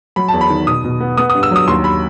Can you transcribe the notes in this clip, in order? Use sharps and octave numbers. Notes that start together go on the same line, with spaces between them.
F#3 B5
E2 A5
B5
D#3
B2 D#6
B2
B3
B3 D#6
D#6
G2
E6
F#3 D#6
D#2 C6
B5